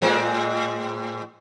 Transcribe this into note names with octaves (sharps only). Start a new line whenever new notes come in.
A2 G#3 C4